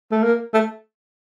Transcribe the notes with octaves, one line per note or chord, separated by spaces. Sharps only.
A3
A#3
A3